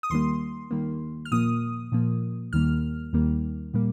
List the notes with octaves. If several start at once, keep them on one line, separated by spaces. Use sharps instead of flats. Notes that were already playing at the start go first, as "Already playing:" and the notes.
D#6
D#2 D#3 G3 A#3 C6
D#2 D#3 G3 A#3
F6
A#2 F3 A#3 D#6
A#2 F3 A#3
D#2 D#3 G3 A#3 F6
D#2 D#3 G3 A#3
A#2 G3 A#3